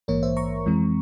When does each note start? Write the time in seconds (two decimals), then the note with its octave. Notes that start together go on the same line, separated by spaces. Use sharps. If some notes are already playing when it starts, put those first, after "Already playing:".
0.08 A#1 G#2 E3 A#3 A#4 C#5
0.23 C5 E5
0.37 A#5 C#6
0.66 F2 E3 G#3 C4